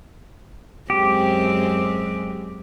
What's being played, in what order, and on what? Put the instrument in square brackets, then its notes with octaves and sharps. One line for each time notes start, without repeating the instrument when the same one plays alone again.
[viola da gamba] F#2 G#3 C4 [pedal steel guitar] G4